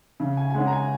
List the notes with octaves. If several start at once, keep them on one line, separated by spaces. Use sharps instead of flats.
C#3
G#5
G#5
G#3 C#4 F#5
A#5
G#5